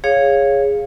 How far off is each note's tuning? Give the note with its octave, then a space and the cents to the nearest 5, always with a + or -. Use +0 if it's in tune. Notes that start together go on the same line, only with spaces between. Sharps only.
G#4 -10 C#5 +0 F5 +0